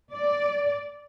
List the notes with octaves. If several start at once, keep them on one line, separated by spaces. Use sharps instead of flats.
D5